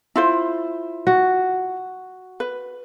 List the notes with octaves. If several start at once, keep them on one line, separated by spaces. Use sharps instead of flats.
E4 F4 C5
F#4
B4